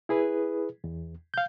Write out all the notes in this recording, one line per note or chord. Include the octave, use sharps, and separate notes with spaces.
E4 G#4 B4
E2
F5 G6